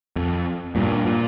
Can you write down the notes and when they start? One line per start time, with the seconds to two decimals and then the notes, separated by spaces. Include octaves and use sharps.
0.16 F2
0.75 G2 A#2
1.05 A#2